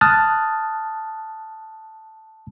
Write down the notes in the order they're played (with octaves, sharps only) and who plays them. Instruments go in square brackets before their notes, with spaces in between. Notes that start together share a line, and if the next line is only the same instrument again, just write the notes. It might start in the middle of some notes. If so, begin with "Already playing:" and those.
[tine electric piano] A5 D#6 F6 F#6 A6